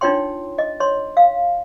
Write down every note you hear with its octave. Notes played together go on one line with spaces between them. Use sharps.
D4 D#4 F4 C#5 G5 C6
D#5
C#5 C6
F5